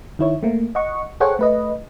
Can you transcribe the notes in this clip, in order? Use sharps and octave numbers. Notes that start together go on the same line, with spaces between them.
D#3 E4 C#5
A3 A#3
D#5 F#5 C#6
G#4 A4 C5 C#5 F#5 G5
A3 B4 D#5